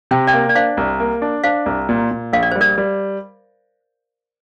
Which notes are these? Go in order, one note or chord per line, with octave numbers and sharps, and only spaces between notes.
C3 G5
D5 G5
A#3
D5
D4 C5 F5
C2
A#3
D4
D4 C5 F5
C2
A#2
A#2
A#1 F5
D5
G3 C5
A#4 D5
G3